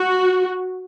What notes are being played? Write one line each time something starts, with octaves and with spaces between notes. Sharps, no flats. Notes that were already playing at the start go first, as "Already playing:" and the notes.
Already playing: F#4